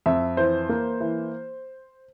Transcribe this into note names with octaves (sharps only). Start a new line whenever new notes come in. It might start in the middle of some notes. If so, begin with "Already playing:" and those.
F2 E5
E3 C5
A#3
E3